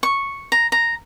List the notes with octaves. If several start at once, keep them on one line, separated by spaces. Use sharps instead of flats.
C#6
A#5
A#5